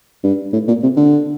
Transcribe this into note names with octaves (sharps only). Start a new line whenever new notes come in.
G2
A2
A#2
C3
D3